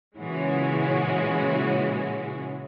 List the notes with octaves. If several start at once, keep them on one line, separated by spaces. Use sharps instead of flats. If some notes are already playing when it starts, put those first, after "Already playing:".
A#2 C#3 E3 G#3 C#4 F#4